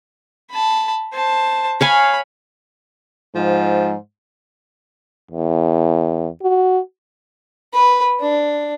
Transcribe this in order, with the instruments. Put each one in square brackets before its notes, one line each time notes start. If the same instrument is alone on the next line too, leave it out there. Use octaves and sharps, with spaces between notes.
[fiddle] A5 B5
C5 A5
[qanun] C#5 F5 G#5 [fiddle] B5
[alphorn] G#2 [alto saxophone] F3
[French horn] E2
F#4
[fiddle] B4
D4